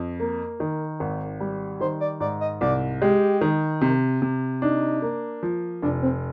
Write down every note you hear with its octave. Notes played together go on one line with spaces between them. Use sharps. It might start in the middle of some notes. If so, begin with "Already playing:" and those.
Already playing: F2
A#3
D#3
G#1
G3
D#3 C5
D5
G#2 D5
D#5
C2 D5
G#3 G4
D#3
C3
C3
D4 D#4
A#3
F3
F1 D4
C4